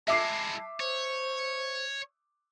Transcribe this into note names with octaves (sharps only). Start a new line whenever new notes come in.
G#3 E4 E5 A5 D6 C7
C5 C#5